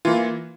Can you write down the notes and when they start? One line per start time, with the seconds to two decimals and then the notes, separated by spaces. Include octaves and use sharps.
0.05 E3 A#3 F4